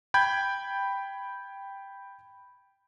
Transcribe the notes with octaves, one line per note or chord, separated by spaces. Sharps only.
G5 B5 G6 G#6